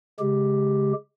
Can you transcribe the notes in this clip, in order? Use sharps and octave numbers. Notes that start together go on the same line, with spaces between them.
C#3 G#3 G4